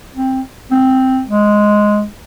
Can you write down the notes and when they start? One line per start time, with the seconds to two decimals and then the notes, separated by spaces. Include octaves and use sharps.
0.16 C4
0.71 C4
1.28 G#3